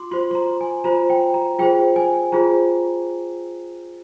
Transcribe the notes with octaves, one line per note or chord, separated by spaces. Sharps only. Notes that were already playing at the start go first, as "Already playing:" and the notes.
Already playing: F4 C6 D6
F4 C5 C6
C6
A#5
G#5
F4 C5 A#5
G5
A#5
F4 G#4 C5 G5
G#5
F4 G#4 C5 A#5